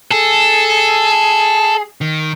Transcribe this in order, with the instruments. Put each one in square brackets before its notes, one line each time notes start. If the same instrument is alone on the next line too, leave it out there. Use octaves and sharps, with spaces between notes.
[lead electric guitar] G#4 [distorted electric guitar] A4
[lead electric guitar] D#3